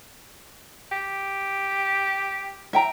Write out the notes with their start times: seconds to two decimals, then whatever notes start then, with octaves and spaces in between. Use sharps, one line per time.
0.92 G4
2.73 E5 G5 A#5